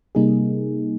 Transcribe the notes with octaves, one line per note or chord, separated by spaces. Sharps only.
C3 G3 A#3 D#4 G#4